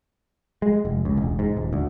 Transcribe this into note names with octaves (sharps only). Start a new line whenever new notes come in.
G#3
F1
C#2
E1
G#2
D#1
D2